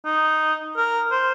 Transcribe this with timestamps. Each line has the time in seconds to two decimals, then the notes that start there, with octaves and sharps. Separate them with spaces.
0.06 D#4
0.77 A#4
1.11 C5